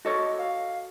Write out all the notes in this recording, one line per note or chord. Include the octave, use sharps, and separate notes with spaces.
F#4 A4 C#5 D#5
F5